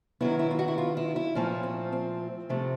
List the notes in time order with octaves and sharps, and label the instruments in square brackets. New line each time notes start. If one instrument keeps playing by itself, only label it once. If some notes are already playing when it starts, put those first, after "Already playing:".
[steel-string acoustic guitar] D#3 F#3 B3 E4
E4
F4
F#4
E4
F4
E4
E4
A#2 F3 A3 C#4
C4
C4
C3 F3 A3